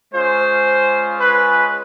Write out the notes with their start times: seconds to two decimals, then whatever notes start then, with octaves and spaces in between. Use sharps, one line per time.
0.13 G#3 C#4 F4 C5
1.20 B4